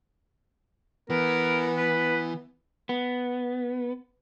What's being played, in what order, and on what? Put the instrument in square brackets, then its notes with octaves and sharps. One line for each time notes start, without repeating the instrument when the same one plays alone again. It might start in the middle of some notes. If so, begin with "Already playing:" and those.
[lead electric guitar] E3 [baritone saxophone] B3 [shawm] A#4
[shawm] B4
[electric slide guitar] B3